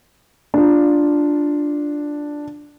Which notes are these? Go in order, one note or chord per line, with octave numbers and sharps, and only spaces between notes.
D4 F4